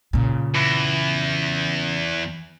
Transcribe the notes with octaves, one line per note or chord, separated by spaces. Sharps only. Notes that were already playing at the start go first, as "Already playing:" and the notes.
A#2 C#3
E2